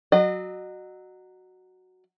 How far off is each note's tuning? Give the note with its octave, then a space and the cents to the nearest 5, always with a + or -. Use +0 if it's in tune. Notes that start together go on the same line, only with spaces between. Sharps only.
F#3 +0 D#5 -35